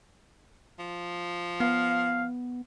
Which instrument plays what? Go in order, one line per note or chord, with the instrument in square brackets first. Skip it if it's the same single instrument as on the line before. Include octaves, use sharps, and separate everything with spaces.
[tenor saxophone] F3
[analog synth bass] B3 [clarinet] F5